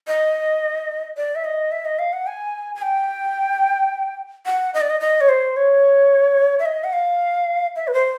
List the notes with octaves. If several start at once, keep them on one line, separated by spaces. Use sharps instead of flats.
D#5
D5
E5
D#5
E5
D#5
F5
F#5
G#5
G#5
G5
F#5
D#5
D5
D#5
D#5
C#5
C5
C#5
E5
D#5
F#5
F5
E5
B4
C5